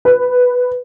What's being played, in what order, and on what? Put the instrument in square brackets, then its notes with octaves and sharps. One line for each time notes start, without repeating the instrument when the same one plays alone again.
[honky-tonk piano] B4